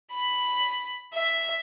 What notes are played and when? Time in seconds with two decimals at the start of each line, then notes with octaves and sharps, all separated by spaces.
0.11 B5
1.14 E5